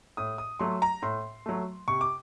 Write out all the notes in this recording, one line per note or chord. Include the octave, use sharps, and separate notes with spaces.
A2 D#6
D#6
F#3 A3 C6
A#5
A2 C6
F#3 A3
C3 C#6
D6